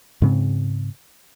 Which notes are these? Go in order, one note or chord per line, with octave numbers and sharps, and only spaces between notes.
G#2 C#3 C4